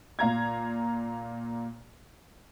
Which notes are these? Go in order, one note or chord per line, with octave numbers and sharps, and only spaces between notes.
A#2 F5 A#5 G#6